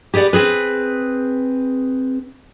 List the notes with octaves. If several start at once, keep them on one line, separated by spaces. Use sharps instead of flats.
G4 G#4 B4 D5 F#5
C4 G#4 B4